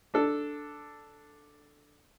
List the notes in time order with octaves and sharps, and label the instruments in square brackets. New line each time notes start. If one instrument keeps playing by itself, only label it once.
[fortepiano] D4 A4